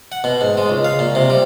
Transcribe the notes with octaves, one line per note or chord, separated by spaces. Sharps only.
F#5
B2
G#2
G#3
C#2
F5
A#2
C3
G3